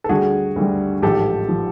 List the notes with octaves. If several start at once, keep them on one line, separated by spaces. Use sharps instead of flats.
A4
D2 D3 G3 F#4 G#4
D2 D3 G3
A1 G#2 F3 G4 A4
F3